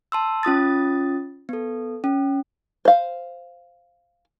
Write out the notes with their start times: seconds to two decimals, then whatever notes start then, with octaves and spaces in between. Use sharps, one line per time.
0.12 A5 C6 E6
0.43 C#4 F4 D#6 A6
1.49 B3 A4
2.04 C#4
2.85 C5 F5